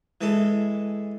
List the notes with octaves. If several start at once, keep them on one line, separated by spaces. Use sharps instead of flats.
E3 G#3 A4